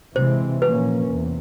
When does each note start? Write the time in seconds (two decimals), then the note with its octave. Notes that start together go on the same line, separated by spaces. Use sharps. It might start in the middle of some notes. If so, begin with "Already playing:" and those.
0.16 C3 E3 G#3 C4 C5
0.62 A#2 F3 A#3 C#4 B4
1.08 E2 C3